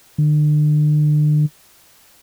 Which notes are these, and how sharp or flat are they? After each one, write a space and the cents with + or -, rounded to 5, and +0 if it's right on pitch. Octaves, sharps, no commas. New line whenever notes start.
D3 +40